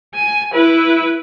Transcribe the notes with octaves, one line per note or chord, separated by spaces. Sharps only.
G#5
E4 B4